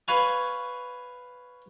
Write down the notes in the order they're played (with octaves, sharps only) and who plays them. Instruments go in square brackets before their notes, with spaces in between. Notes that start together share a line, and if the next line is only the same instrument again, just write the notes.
[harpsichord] B4 C#5 F5 G#5